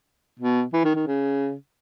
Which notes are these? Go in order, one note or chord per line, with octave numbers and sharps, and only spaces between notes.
B2
E3
D#3
D#3
C#3